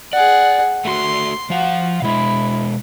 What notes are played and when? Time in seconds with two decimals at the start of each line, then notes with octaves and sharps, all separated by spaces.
0.13 G#4 D5 F#5
0.85 A3 F#4 C6
1.50 F3 F#4 F5
2.02 B2 G#3 E4